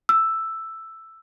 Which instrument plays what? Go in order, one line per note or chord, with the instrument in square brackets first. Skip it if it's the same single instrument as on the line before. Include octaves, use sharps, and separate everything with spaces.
[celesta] E6